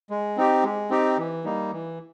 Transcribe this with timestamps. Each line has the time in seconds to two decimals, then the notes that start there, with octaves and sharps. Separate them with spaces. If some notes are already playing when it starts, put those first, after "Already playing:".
0.10 G#3
0.37 C4 D#4 G4
0.63 G#3
0.90 C4 D#4 G4
1.18 E3
1.44 G3 A#3 D#4
1.72 E3